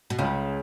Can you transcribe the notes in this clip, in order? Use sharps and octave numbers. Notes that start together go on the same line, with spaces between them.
B2
C#2 C#3